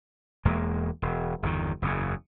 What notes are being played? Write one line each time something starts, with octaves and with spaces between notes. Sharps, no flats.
E1 E2 G#3 A#3
E1
G1 E2 D3 D#3
F#1 E2 C#3